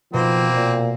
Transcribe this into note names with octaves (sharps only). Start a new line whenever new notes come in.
B2 F3 A#3 C4
A#2